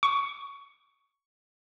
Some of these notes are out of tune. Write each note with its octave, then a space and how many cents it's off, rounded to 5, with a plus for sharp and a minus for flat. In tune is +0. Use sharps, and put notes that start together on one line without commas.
C#6 +15